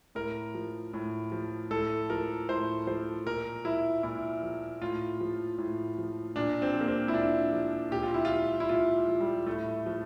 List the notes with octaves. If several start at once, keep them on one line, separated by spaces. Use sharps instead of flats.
A2 A#4
F3
A2
F3
A2 A4
F3 A#4
A2 C5
F3 C5
A#2 A#4
F3 E4
A#2 E4
F3
A2 F4
F3
A2
F3
A#2 D4
C4
F3
A#3
C4
E4
A#2 D4
F3
A#2 G4
F4
E4
F4
F3
E4
A#2 F4
F3
G3
A2 A3
F3